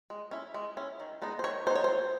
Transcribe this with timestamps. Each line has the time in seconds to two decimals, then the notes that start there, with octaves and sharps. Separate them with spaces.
0.10 G#3
0.31 C#4 E4
0.54 G#3
0.77 C#4 E4
1.00 D#3
1.22 G#3 B3 D#4
1.39 C5
1.44 D#3 C#5
1.66 G#3 B3 D#4 C5
1.75 C#5
1.84 E3 C5